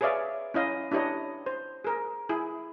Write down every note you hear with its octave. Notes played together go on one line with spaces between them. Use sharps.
G#4 B4 C#5 D5 E5 F5
C#4 E4 D#5 F5
D4 E4 G4 C#5 D#5
C5
G#4 A#4
E4 G#4